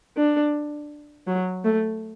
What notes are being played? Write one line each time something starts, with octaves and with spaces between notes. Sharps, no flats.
D4
F#3
A3